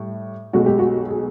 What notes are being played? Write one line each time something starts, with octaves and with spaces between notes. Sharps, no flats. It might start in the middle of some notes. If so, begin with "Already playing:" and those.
Already playing: A2 G3
B1 B2 G#3 F#4
G4
F#4
G#4